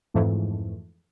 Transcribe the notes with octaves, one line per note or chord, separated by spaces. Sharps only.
F2 G#2 E3 F3 A3